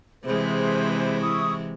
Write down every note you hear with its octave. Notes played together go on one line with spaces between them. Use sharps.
C3 E3 G#3 G#4 B4 C5
E4 C#6 D#6